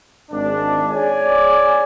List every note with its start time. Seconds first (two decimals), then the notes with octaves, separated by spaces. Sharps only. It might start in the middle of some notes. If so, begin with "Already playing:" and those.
0.31 G#1 D4
0.91 G#4 C#5 D5 G#5